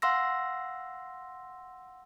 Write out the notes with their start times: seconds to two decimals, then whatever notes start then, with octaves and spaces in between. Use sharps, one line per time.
0.02 F5 F#5 C6 E6 A#6